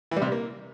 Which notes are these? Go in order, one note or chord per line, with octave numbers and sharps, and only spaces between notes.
E3
G3
C3
G3
A#3